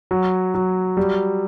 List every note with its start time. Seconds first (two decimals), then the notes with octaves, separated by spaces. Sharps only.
0.11 F#3
0.55 F#3
0.97 G3